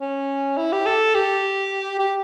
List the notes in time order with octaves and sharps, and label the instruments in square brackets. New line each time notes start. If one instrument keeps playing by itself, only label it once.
[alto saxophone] C#4
E4
G4
A4
G4
G4